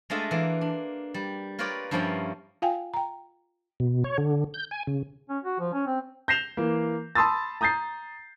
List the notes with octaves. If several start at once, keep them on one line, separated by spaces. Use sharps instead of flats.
G#3 A3 D4 F4 D#5 E5
E3 A#3
D4
G3
F4 A#4 B4 C#5 D5 G5
G2 F3 A#3 C#4 E4 G5
F4 F5 G5 G#5
G5 A#5
B2
C#5
D3
G6
G#5
C#3
C#4
F#4
F3
C#4
C4
G6 A#6 C7 E7 F7 G7
E3 A#3
A5 B5 C6 D#6 E6 A6
A#5 D#6 G6 A6 C7